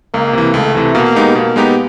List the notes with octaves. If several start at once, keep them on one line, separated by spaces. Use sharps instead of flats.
C#2 A#3
C3 E3
C#2 A3
C3 E3
B2 A#3
G#3 B3 D#4 G4
B2 A#3
G#3 B3 D#4 G4